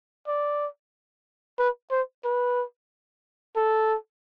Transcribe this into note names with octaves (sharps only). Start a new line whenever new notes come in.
D5
B4
C5
B4
A4